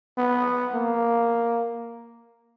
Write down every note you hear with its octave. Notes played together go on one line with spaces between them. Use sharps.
B3
A#3